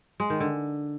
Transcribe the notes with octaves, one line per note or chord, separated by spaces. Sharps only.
G#3
D#3
D3